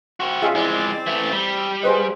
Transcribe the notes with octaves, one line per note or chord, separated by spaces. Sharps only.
C4 F#4
B2 C#4 F4 G#4 D#5 E5
F2 G#3 C4 E4 D5
E3 A3
G3
G#4 B4 C5 D#5